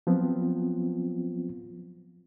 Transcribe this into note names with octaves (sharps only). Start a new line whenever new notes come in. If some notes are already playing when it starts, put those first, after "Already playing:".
F3 F#3 B3 C4 F4